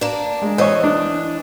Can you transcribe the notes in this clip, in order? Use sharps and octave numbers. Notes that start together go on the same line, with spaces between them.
A#3 D4
G#3
E3 C5 C#5 D#5
D4